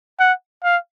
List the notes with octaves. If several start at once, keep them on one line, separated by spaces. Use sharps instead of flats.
F#5
F5